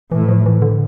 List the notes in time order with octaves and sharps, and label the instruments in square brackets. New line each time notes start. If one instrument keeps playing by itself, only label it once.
[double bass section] A2 [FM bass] E3
[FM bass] F3
E3
D3